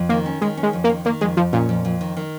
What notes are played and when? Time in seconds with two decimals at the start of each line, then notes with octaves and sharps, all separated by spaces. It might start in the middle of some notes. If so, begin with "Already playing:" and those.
Already playing: F2
0.09 D#3 A#3
0.26 C#4
0.41 D#3 G#3
0.57 C#4
0.63 G#3
0.73 F2
0.84 A#3
0.89 D#3
1.05 D#3 A#3
1.21 F2 G#3
1.37 F2 F3
1.53 A#2 C#4
1.69 F2
1.85 F2
2.01 D#3
2.17 D#3